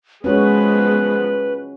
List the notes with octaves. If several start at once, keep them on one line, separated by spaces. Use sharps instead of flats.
F3 G#3 B3 C#4 F#4 B4 C#5